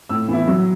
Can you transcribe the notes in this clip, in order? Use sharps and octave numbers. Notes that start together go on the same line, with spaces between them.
A2 E6
E3 B3 E4
F#3